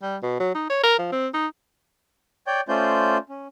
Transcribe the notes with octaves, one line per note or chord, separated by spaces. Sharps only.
G3
B2
F#3
D#4
C#5
A#4
F3
C4
D#4
C#5 D5 G5 G6
A3 C#4 F4 C5 D5 G6
C#4